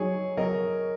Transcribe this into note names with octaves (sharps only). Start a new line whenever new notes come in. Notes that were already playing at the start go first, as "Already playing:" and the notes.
Already playing: F#3 D#4 G#4 C#5
F#3 A#4 D#5